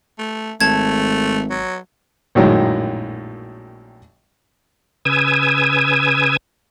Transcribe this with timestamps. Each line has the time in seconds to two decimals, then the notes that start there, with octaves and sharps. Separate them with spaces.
0.18 A3
0.60 G#1 A3 A5 G#6
1.50 F#3
2.35 A#1 F#2 A2 D#3 F#3 G#3
5.05 C#3 B4 G#5 D#6 E6 G#6